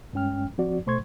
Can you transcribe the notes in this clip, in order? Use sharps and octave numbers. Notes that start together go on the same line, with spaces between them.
G2 G#3 C#4 G5 F6
F3 C4 F#4 D5
B2 A3 C5 C6 C#6 G#6